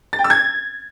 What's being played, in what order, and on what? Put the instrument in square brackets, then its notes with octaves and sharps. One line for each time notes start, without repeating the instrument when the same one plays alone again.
[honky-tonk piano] A6
G5
E6
G#6